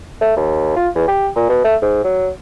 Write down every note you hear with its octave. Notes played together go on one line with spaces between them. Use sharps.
A3
D#2
F4
E2
G4
A#2
B2
A3
G#2
F#3